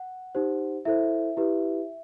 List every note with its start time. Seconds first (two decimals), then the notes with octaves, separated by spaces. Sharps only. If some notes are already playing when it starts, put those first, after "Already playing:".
Already playing: F#5
0.35 D#4 G4 C5
0.85 E4 A4 C5 E5
1.37 E4 G4 B4